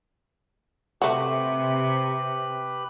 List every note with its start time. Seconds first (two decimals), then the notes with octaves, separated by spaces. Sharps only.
1.02 C3 A3 F#4 G4 B4 B5